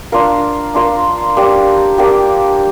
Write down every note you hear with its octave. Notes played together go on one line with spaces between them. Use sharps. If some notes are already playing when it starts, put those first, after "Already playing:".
D4 F4 A#4 F5
D4 F4 A#4 F5
A#3 D4 G4
A#3 D4 G4